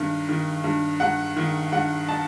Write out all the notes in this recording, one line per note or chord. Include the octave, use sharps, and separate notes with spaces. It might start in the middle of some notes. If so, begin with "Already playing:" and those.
Already playing: G2 D#3
D#3
G2
G2 F#5
D#3
G2 F#5
A5